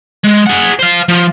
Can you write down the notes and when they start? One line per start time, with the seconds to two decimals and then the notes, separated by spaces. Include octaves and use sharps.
0.24 G#3
0.47 G#4 F#5
0.79 C5 F5
1.09 F3